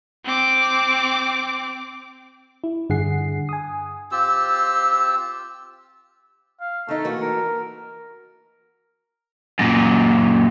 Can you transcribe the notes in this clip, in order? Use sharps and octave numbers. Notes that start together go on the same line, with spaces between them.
C4 D6
E4
G2 D3 G#4 F#5 C7
G#5 D#6
C4 F4 G4 E6
F5
D#3 A3 D#4
E3 A#3 F#4
A#4
F#2 A#2